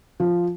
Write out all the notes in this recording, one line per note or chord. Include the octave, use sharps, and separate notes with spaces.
F3